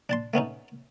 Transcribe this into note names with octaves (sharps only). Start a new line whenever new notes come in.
D4 A5 C6
A3 B3 C#4 D#4